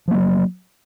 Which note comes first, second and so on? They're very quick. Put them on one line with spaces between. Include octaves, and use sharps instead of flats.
F3 A#3 F#3